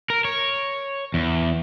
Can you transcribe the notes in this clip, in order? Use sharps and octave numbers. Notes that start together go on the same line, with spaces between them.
A#4
C#5
E2